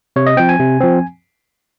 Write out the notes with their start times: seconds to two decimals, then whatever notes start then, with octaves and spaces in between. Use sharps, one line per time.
0.16 C3 C#5
0.27 D#5
0.37 F3 C4 G5
0.49 G#5
0.59 C3
0.81 F3 C4